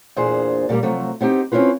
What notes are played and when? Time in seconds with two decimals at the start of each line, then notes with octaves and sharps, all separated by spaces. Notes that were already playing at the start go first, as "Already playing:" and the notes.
0.16 E2 A#2 D4 G#4 C5
0.69 A#2 D3 G3 A#3
0.83 C3 F3 F#3 A3
1.21 B3 C4 D#4 G4
1.52 C4 C#4 E4 F4 B4